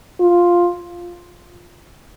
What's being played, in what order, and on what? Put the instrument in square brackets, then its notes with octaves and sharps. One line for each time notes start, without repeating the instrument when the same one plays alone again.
[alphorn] F4